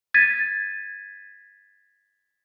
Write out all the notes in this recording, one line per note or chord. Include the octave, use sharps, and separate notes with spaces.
G#6 A6 B6 D#7